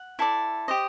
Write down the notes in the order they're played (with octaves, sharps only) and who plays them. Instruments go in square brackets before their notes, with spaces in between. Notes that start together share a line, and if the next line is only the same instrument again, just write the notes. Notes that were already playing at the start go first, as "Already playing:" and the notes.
Already playing: [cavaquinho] F#5
E4 A4 D5
G4 C5 D#5